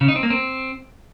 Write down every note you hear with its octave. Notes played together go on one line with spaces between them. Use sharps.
C#3
D#4
C4
A#3
C4